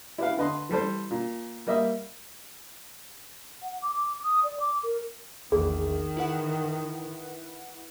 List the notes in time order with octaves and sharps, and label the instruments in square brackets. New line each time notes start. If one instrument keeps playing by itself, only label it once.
[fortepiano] E4 G4 B4 F5
D3 B4 D#5 C6
E3 G3 A4 C5
A#2
G3 A#3 D#5 E5
[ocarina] F#5
D6
D6
D#6
D5
D6
A#4
[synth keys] A#1 E2 [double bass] D#3 [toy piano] G#4
[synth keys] E4 B4 F#5